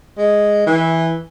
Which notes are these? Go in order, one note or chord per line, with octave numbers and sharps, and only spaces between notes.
G#3
E3